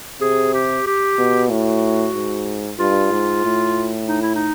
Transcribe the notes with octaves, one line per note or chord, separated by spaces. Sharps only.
C3 G#4
G4
G4
B2
A2 F#4
G#2
G2 F4
G#2
A2
D#4
E4
D#4